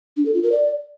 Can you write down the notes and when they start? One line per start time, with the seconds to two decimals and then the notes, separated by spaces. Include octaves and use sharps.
0.17 D4
0.25 A4
0.34 F4
0.43 A#4
0.52 D5